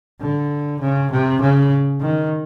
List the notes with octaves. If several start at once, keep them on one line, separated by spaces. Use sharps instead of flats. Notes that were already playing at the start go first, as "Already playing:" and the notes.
D3
C#3
C3
C#3
D#3